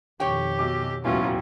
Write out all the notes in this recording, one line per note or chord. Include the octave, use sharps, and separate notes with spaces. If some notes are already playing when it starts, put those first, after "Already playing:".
F2 B2 D#3 G4 C#5 G5
B1 D6
E1 D#2 A2 E3 F#3 C#4 F4